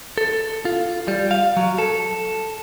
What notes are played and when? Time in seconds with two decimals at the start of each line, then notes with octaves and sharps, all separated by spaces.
0.18 A4
0.65 F4
1.08 G3
1.31 F5
1.57 F#3
1.79 A4